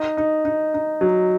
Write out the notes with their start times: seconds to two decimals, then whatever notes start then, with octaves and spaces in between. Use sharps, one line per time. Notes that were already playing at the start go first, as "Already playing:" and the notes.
Already playing: D#4
0.17 D#4
0.45 D#4
0.74 D#4
1.01 F#3